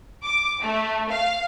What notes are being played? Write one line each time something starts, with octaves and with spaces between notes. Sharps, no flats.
D6
A3
F5